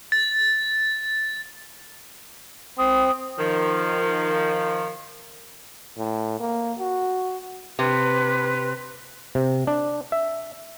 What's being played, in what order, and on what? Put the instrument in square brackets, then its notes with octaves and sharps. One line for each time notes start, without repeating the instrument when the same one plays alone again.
[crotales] A6
[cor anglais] C4 [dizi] D#6
[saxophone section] D#3 F3
[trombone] A2
A#3
F#4
[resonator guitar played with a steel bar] C3 [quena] B4
[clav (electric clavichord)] C3
D4
E5